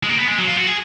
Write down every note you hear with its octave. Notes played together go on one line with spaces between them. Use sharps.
G#3
A#3
B3
G#3
F#3
F4
F#4
G#4